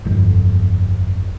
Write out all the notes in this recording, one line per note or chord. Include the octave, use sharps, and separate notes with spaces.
G1 F2